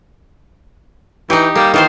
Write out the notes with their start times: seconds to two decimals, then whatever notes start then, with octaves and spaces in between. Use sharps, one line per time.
1.30 E3 D#4 G4
1.55 G3 A#3
1.74 D#3 E3 F4 C5